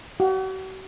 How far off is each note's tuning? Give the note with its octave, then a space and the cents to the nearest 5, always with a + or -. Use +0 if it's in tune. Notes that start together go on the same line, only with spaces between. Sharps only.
F#4 +45 F#5 -40